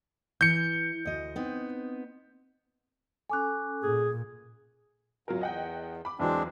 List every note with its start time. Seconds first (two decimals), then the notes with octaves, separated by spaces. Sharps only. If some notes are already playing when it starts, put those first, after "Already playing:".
0.41 E3 G6 C#7
1.05 D2 D#5
1.36 B3 C4 D#4
3.30 C#4 A4 G#5 D6 F#6
3.82 A#2 G#4
5.28 F#2 F#3 F4 A#4
5.41 E2 D#5 F#5 G5
6.05 B5 D6
6.20 E2 E3 F#3 G#3 C4 D4